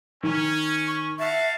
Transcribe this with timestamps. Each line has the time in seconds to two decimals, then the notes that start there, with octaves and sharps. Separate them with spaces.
0.23 D#3 C#4
0.87 C#6
1.19 F#4 E5 F5 A5